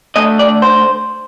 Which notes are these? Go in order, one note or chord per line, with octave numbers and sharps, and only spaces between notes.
D3 A3 D#5
D5
C5